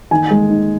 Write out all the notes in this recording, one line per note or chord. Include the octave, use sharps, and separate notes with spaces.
D#3 G#5
G#3
D#4